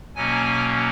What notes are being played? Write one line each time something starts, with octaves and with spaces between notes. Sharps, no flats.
B2 F#3 A#3 C#4 G#5